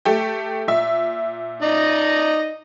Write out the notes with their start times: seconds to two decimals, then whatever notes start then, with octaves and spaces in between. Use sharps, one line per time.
0.05 A3 G4
0.68 A#2 E5
1.62 D#4 D5 D#5